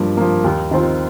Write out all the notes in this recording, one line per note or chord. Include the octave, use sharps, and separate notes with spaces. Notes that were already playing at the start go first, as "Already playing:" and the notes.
Already playing: G2 F3 A#3
F3 A#3
D#2
D#3 C4 F4